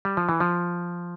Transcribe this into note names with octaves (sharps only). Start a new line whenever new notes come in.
G3
F3
E3
F3